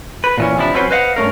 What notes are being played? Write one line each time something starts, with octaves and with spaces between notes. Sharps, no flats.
B4
A#2 E3 C#4
C3 F3 D4 E4
F#3 C4 C#4 B4 C5
B4 C5 D#5 F5 F#5
G2 A3 C#4 A#4